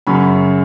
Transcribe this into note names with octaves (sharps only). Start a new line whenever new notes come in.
F#2 C#3 F#3 C#4 B5